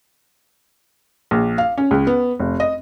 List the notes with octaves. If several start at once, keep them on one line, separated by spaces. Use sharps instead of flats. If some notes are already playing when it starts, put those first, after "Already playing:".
A#1
F5
C#4
C#2
B3
F1
D#5